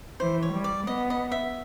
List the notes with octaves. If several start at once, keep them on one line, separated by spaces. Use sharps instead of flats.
E3 C5
C#5
G3
D5
B3 D#5
D#5
E5